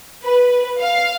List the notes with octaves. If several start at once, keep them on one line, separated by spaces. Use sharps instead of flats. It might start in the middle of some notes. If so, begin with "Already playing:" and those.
B4
F5